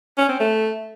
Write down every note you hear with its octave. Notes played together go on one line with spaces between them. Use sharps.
C#4
C4
A3